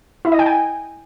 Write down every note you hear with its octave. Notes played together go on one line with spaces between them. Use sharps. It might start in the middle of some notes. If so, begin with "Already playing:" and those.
E4
D#5
G5
G#5